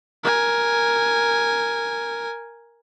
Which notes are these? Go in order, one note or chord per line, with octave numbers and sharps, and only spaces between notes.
A#4 G#5